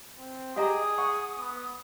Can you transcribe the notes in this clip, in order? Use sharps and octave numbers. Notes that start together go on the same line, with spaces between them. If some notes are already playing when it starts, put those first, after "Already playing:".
C4
G4 G#4 D#5 F#5 G#5 A#5 D#6
F#5 C#6
B3